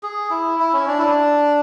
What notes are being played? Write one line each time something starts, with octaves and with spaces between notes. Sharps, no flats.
G#4
E4
E4
C#4
D4
E4
D4